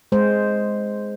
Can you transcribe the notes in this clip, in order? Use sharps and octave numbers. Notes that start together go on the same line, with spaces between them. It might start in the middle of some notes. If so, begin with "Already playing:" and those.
G#3 C5